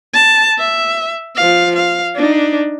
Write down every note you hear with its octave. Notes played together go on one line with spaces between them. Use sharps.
A5
E5
F3 F5
F5
D4 D#4